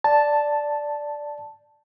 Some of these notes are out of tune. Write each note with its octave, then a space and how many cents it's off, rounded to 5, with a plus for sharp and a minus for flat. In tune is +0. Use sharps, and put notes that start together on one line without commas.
D5 +0 A5 +0